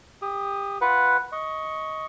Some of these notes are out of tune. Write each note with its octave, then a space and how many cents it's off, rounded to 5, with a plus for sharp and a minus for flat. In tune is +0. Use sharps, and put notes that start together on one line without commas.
G4 +25 D#6 +0
F4 +0 B4 +0 F#5 +0
D#5 +15 C#6 +0